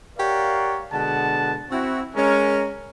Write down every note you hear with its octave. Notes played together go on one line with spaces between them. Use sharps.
G4 A#4 C#5 D5 F5 F#5
B2 D3 G#3 F#5 A5
C4 E4 F#4
G#3 C#4 A#4